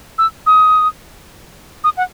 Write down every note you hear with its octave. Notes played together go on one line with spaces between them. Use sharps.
E6
D#6
D#6
F#5